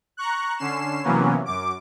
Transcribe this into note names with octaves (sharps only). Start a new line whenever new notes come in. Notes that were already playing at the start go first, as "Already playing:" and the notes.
A#5 C#6 F#6
D3 C#4 C7 E7
C3 E3 F#3 A#3 B3 C#4
F#2 D6